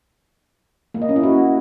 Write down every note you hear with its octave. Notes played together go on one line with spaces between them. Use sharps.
A#3
D#5
C#4
E4
F#4